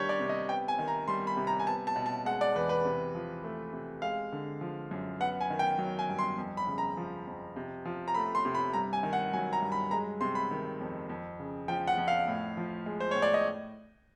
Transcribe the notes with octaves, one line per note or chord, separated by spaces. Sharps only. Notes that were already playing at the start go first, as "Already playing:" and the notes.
Already playing: D#3 G3 D4 G4 C#5
D5
C3
D#5
B3 G5
G#5
D#3
A#5
G3 C6
B5
C3
A#5
G#5
B3 A5
A5
B2
A5
G#3 F#5
D5
E2 B4
B4
C3
F3
A3
C3
G#3 F5
D3
F3
F#2
B3 F#5
G#5
D#3
G5
F#3
G#5
G2
C6
F2
B5
C#3
A#5
F3
F2
C3
F3
A#5
A3 B5
C6
C3
B5
G2 A#5
G#5
D#3
F#5
F#3 G#5
A#5
G2
B5
G#3 A#5
C3 C6
B5
D#3
F2
F2
C#3
F3 G5
F#5
F2
F5
A2
F3
G#3
C5
A2 C#5
D5
D#5